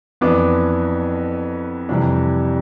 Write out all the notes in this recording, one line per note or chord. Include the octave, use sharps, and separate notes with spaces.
F2 E3 B3 D4 D6
F2 C3 E3 G3 D4